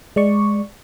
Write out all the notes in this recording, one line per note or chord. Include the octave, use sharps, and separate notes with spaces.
G#3 D5 C#6